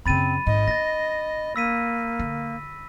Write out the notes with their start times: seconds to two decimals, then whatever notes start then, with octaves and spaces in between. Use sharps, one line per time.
0.06 F#2 C#3 C4 B5 A6 D#7
0.47 G#1 G#2 D#5
0.68 D4 A6 A#6
1.56 A#3 E6 B6 D#7
2.19 D3